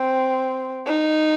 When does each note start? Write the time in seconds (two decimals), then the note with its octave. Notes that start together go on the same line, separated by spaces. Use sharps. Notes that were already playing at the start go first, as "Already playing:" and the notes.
Already playing: C4
0.87 D#4